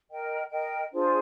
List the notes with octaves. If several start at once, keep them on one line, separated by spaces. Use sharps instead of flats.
A#4 D#5 G5
A#4 D#5 G5
D4 F4 G#4 C5